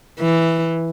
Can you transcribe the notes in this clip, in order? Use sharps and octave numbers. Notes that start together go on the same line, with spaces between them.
E3